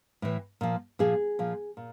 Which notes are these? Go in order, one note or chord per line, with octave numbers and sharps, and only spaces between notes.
A2 E3
A#2 F3
A#2 F3 G#4
A#2 F3
A#2